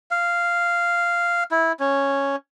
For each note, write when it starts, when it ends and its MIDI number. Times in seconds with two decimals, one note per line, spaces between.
0.11 1.44 77
1.51 1.72 64
1.80 2.36 61